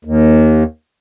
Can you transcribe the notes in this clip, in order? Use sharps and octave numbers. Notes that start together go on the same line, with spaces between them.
D#2